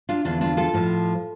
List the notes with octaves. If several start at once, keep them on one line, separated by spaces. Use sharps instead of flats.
D4 F4
E2 D3 F3 D4 F4
D4 F4
F4 A4
A2 F3